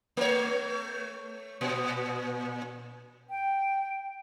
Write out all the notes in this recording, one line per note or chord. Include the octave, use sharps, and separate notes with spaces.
A3 C#5
A#2
G5